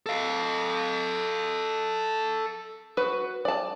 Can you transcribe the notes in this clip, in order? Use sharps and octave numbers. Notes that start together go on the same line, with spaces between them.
A4 F5
F#4 B4
D5 A5